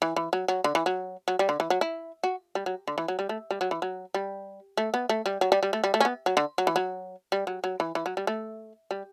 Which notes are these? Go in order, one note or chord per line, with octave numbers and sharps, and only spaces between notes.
E3
E3
F#3
F#3
D3
E3
F#3
F#3
G3
D3
E3
F#3
E4
F#4
G3
F#3
D3
E3
F#3
G3
A3
G3
F#3
E3
F#3
G3
A3
B3
A3
G3
F#3
G3
G3
A3
G3
A3
C#4
B3
F#3
D3
F#3
E3
F#3
G3
F#3
F#3
E3
E3
F#3
G3
A3
G3